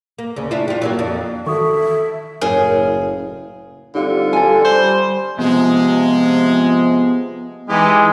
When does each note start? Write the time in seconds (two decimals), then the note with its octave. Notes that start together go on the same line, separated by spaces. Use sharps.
0.18 A#3
0.36 D2 C#3
0.51 D4 E4 F4
0.68 G3 F4
0.82 F#3 G3 A#3
0.99 F2 D4
1.47 D#3 E3 F#4 A4 E5 C#6 D#6
2.42 F#1 A2 C#3 G#4 A#4
3.95 D3 G3 C4 D#4 F4 G4 F5
4.33 G4 A4 D5 G#5
4.65 G3 C5
5.39 C3 F3 G#3 B3
7.69 E3 G#3 D#4 G4